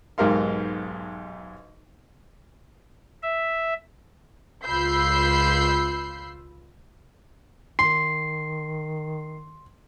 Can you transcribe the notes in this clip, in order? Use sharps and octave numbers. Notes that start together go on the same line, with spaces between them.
B1 G#2 G4 A#4 F5 C6
E5
C#2 F4 B5 E6 G6 C7
D#3 C6 C7